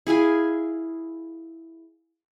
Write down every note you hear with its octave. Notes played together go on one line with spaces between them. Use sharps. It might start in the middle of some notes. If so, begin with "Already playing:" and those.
E4 G#4 F5 G#5